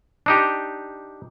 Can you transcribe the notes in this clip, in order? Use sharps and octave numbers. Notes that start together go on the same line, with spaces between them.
D4 D#4 G4